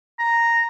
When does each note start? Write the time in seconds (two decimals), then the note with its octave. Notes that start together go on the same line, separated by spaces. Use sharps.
0.19 A#5